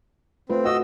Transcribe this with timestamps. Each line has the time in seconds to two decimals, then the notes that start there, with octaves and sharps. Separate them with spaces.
0.50 A3 C4 F4 B4
0.65 F#4 D#5 F#5 E6